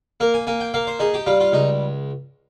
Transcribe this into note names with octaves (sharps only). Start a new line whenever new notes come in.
A#3 A#4
G#5
A#3 G#5
G5
A#3 F5
C5
D#4 G#4
G4
G3 F4
F4
C#2 D#4